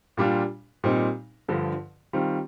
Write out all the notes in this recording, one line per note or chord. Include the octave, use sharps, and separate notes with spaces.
A#2 G3 D4 F4
A#2 G3 C4 D#4
G2 D3 F3
D#3 G3 C4 F4